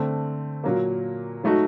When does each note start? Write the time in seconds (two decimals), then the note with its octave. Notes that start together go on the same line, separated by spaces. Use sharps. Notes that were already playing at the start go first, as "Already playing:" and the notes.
Already playing: D3 A3 C4
0.64 A#2 F#3 A#3
1.43 F#3 A3 D#4 F#4